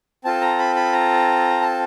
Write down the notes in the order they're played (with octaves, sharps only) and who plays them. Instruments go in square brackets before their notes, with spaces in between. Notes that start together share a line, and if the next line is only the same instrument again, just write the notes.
[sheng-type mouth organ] C4 F4 A4 A5
A#5
B5
B5
A#5
A5